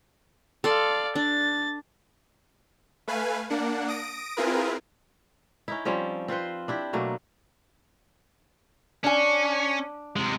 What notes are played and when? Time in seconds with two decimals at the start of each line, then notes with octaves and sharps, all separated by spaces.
0.64 A4 D5 F5 C6
1.15 D4 A6
3.07 A3 B4 F5 G#5
3.50 A#3 D4 F#5
3.88 D#6 A#6 D7
4.37 C4 E4 F4 G#4 A#4 B4
5.68 C#4 D#4 E4
5.85 F3 G3 C4 C#4
6.28 C4 F4 B4 C5
6.68 D4 E4 G4
6.93 B2 F#3 A3 A#3
9.04 C#4 D4 G#5
10.16 C3 G#3